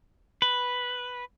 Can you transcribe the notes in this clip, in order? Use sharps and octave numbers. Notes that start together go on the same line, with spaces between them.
B4